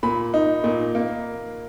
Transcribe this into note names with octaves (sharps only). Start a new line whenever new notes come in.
A#2 B5
D#4
A#2
A#3